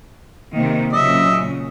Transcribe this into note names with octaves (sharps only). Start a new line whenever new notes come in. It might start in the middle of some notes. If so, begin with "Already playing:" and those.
C3 D#3 A#3
A#2 C#3 F#3 D#5 E5